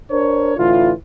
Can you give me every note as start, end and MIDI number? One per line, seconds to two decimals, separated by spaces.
0.11 0.55 62
0.11 0.55 70
0.11 0.55 72
0.11 0.55 73
0.57 0.92 45
0.57 0.92 50
0.57 0.92 52
0.57 0.92 64
0.57 0.92 65